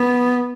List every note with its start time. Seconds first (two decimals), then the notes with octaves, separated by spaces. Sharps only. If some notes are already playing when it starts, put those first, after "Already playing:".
Already playing: B3